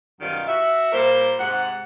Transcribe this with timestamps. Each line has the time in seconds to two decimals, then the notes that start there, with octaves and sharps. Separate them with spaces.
0.20 F#2 B2 D#3 G3 F4
0.47 F#4 E5
0.92 A#2 G3 A#4 C5
1.39 G#2 C3 F#5